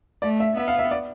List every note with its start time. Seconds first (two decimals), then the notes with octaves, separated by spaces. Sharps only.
0.22 A3 D5
0.40 E5
0.57 B3 E5
0.68 F5
0.79 E5
0.91 D5